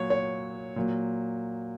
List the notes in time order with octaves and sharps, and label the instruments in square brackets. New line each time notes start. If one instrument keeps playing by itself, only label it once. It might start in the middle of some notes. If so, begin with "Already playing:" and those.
Already playing: [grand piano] A#2 F#3 C#5
C#5
A#2 F#3